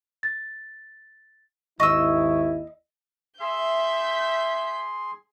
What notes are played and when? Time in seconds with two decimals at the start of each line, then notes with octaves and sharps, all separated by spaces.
0.23 A6
1.80 G#1 D#2 E4 D#5 C#6 E6
3.40 G#4 E5 C6 G6 B6